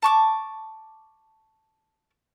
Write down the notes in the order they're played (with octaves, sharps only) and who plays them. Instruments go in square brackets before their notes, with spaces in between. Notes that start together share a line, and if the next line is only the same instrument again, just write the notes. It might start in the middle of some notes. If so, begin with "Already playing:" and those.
[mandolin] A5 C#6 D6